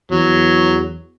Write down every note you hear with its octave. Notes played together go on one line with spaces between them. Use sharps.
E2 F#3